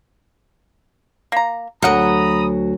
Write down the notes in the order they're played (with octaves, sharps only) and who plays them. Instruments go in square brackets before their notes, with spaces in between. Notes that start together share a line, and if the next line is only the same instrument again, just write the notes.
[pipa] A#3 A#5
[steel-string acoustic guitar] D2 F#3 [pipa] A#4 F#5 [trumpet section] A#5 B5 D#6